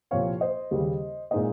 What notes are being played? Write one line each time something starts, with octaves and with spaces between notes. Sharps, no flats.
C2 A#2 F3 C4 C#5 F5
C5 D#5
D#2 C#3 G3
A#2 G#3 C4 D#4 C5 D#5